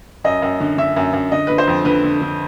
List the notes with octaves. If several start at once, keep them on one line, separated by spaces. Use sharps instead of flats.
F#2 D#5
F#2
D3
D3 E5
F#2
F#2
D3 D#5
D3 B4
C5
F2
D3 B4
D3
D3